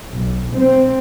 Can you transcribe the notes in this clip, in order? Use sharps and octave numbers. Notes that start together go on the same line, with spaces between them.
B1
C4